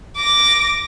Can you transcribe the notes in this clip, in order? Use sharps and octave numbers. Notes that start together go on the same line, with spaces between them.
D6 A#6